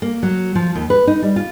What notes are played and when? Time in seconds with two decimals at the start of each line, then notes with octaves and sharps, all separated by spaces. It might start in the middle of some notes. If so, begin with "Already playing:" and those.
0.02 A#3
0.23 F#3
0.55 F3
0.75 D#2
0.90 B4
1.07 D#4
1.22 G3
1.36 F4